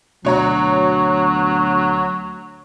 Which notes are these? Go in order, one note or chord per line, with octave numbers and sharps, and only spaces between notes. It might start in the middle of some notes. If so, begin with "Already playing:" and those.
D2 B2 F#3 C#5 A#5